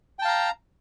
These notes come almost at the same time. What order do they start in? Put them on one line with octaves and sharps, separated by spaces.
G5 A5 F5 A#5